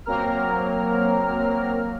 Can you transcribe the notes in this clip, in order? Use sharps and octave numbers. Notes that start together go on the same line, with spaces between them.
F#3 A#3 C4 A#4 A#5 F6